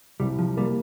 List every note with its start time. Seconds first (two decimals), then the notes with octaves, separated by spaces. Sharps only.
0.20 C2 G3
0.39 F3
0.57 G3 A#3